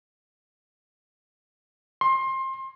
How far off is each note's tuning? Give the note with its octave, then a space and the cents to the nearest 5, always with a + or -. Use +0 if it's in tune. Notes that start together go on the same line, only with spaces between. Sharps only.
C6 +25